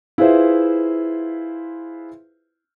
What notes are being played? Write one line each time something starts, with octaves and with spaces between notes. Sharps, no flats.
E4 F4 G#4 B4 C5 E5